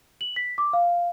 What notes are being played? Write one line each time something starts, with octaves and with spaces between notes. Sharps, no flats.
F#7
B6
D6
F5